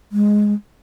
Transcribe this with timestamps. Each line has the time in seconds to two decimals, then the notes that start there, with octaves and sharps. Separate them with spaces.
0.12 G#3